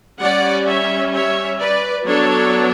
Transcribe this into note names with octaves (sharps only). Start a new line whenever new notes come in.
G3 C#4 D5 F#5
C#5 E5
C#5 E5
B4 D5
F#3 B3 D4 A4 C#5